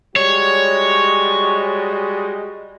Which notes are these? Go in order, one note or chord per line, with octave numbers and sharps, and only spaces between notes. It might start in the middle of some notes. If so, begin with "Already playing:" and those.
G3 G#3 F#4 C#5